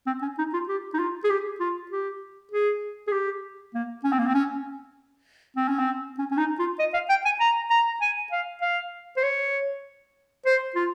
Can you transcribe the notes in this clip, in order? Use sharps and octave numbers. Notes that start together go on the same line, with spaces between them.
C4
C#4
D#4
F4
G4
D#4
F4
G#4
G4
F4
G4
G#4
G#4
G4
A#3
C#4
C4
A#3
C4
C#4
C4
C#4
C4
C#4
C#4
D#4
F4
D#5
F5
G5
G#5
A#5
A#5
G#5
F5
F5
C5
C#5
C5
F4